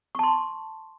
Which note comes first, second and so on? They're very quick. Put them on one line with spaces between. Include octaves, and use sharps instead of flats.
C#6 A5 C6